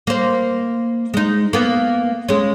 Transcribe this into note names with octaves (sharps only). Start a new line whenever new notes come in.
A#3 C5
G#3 D#4
A#3 B3
G#3 C#4